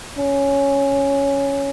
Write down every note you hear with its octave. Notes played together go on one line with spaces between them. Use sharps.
C#4